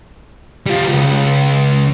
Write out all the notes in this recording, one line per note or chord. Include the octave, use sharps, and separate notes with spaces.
G3 F4
C#2